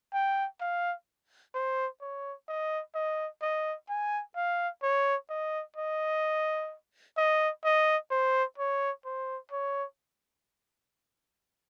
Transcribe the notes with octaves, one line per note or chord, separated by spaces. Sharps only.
G5
F5
C5
C#5
D#5
D#5
D#5
G#5
F5
C#5
D#5
D#5
D#5
D#5
C5
C#5
C5
C#5